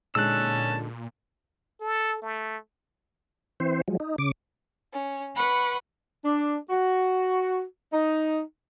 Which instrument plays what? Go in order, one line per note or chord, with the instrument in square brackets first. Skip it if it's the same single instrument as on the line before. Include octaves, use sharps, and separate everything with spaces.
[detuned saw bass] A#2 [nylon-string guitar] D3 G#3 D#4 [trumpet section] C#4 A5 [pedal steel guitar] E6 F#6
[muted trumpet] A4
A3
[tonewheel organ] E3 C4 C5
F3 F#3 G#3
D#4
C#3 D6
[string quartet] C#4
B4 F#5 B5 C#6
[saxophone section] D4
F#4
D#4